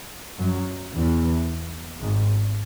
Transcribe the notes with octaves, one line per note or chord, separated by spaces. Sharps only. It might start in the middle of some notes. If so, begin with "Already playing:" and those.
F#2 F#3
E2 E3
G#1 G#2